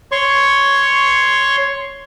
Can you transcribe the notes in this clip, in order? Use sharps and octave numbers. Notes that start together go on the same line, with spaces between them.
C#5 C6 C#6